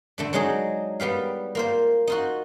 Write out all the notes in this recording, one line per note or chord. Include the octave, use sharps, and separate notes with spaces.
D3 A3 D4
F#3 G#3 D4 D#4 G#4
G3 B3 G4 F5
A#3 F4 C5
D#4 F4 F#4